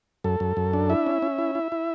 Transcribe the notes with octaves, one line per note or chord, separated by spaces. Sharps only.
F#2 A4
F#2
F#2
D4
E4 E5
C#4
C#4
E4
E4
E4